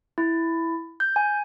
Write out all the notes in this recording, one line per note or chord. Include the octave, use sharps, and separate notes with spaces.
E4
G6
G#5